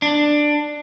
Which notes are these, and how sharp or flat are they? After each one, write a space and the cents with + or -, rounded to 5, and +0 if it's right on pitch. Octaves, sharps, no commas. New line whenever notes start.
D4 +10